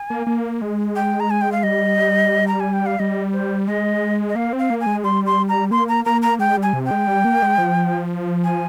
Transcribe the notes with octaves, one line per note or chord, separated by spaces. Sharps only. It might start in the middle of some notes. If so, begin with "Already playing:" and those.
Already playing: G#5
A#3
A#3
G#3
G5
A#5
G#5
G5
F5
G3 D#5
A#5
G#5
G5
F5
G3 D#5
C5
G#3 D#5
D#5
A#3 F5
C4
F5
A#3
G#5
G#3
G3 C6
C6
A#5
A#3 C6
A#5
A#3 A#5
A#5
G#3 G5
G3
G#5
C3
G5
G#3
G3
A#3
G#3
F3
G#5